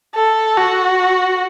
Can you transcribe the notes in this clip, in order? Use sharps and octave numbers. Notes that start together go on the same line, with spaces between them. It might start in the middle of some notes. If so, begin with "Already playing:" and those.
A4
F#4